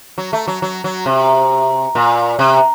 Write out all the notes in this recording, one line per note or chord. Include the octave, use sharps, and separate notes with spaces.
F#3
A3
F#3
F#3
F#3
C3
A#2
C3